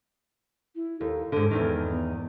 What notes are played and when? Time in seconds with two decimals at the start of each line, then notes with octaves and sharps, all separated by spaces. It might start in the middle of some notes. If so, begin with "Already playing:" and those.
0.75 E4
1.01 D#2 A4
1.32 G#2 D3 A4
1.51 E2 G#2 D#3 A4
1.85 B3